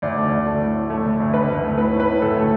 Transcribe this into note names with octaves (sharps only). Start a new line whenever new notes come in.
D2 D5
A3
D5
D2
A3
A2
A2
A3
D3
D2
D2 B4
D2
A3
A2 B4
A2
B4
A2
D2 A4
A3